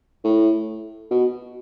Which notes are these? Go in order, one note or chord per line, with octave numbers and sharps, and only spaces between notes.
A2
B2